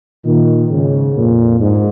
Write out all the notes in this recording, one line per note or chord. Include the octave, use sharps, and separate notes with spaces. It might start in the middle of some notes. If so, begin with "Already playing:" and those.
A#2 D#3
G#2 C#3
F2 A#2
G#2